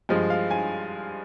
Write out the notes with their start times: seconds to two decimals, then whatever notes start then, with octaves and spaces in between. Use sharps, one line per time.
0.09 G2 F3 G#3 D#5
0.30 F5
0.51 G#5